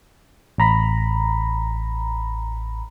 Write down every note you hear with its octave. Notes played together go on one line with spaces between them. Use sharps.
A1 A#5 B5